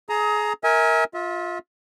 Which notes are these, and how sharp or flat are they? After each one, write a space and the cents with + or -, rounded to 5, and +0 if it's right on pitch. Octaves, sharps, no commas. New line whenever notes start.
G#4 +25 A#5 +0 D#6 +30
A#4 +0 E5 -35 G#5 -5
F4 +15 E5 -30